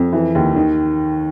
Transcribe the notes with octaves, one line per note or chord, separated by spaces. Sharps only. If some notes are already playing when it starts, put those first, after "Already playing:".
Already playing: F2
E3
D#2
D#3